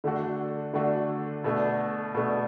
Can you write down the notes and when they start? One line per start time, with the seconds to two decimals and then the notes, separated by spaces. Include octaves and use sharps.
0.04 D3 A3 D4 F#4
0.74 D3 A3 D4 F#4
1.44 B2 A3 D4
2.15 B2 A3 D4